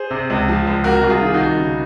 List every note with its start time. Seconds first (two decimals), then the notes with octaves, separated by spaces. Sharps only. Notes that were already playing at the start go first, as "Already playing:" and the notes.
Already playing: G#4 C5
0.10 C3
0.30 C#2
0.48 F3
0.67 C#2
0.84 C3 F#4 A#4
1.01 C2 F#4
1.10 F4 G#4
1.22 D#3 G#4
1.34 D#4 F#4
1.40 C2
1.58 C#3